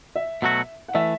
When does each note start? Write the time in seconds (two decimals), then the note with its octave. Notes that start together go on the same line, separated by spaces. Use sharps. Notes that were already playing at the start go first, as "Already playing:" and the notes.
0.16 E5
0.42 B2 F#3 A3 F#4
0.88 F#5
0.94 E3 A3 E5